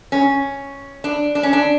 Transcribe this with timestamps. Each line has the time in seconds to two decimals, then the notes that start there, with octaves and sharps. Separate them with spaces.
0.12 C#4
1.04 D4
1.35 D4
1.43 C#4
1.53 D4